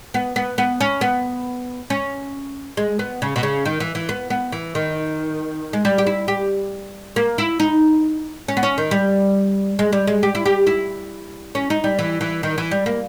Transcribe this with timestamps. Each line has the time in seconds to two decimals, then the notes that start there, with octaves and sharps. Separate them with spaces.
0.14 B3
0.36 B3
0.58 B3
0.81 C#4
1.01 B3
1.90 C#4
2.77 G#3
2.99 B3
3.22 C#3
3.36 B2
3.43 C#3
3.65 D#3
3.80 E3
3.95 E3
4.09 B3
4.30 B3
4.52 E3
4.75 D#3
5.73 G#3
5.85 G3
5.98 G4
6.07 E4
6.28 G4
7.16 A#3
7.38 E4
7.60 D#4
8.48 C#4
8.57 B3
8.63 C#4
8.78 D#3
8.91 G3
9.79 G#3
9.93 G3
10.07 G#3
10.23 G4
10.35 E4
10.46 G4
10.67 E4
11.55 C#4
11.70 D#4
11.84 G3
11.99 E3
12.21 E3
12.43 D#3
12.58 E3
12.71 G3
12.86 A#3